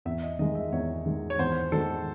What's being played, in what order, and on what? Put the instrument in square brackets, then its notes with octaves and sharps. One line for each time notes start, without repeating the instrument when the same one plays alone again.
[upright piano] E2 [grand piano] E5
[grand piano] D#5
[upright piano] D#3 G#3 [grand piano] D#5
[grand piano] E5
[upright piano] E2 [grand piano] C#5
[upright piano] D#3 G#3
[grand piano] C#5
[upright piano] E2 [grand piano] C5
[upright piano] D#3 G#3 [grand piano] A4